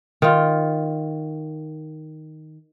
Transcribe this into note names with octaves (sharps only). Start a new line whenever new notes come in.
D#3 F4